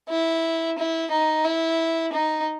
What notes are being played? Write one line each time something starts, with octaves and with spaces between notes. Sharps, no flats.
E4
E4
D#4
E4
D#4